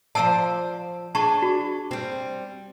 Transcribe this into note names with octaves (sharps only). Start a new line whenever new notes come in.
F3 C5 D5 A5 E6
D4 G#4 A5 C#6
F#4
G3 C4